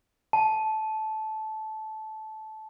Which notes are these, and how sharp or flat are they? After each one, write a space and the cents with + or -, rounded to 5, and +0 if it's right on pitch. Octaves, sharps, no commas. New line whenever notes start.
A5 -15